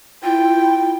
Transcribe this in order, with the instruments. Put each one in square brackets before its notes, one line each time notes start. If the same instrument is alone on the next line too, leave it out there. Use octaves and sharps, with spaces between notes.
[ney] E4 [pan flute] F4 [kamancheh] G5